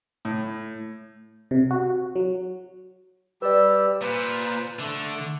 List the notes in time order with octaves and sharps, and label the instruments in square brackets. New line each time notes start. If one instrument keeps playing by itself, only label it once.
[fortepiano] A2
[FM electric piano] C3
F#4
F#3
[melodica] G3 G4 E6 [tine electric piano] B4 D5
[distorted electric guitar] A#2 [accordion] B4 C5
[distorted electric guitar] D3 [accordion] A3